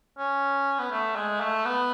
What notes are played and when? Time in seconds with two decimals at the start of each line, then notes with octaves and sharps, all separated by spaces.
0.18 C#4
0.79 B3
0.92 A3
1.16 G#3
1.41 A3
1.65 B3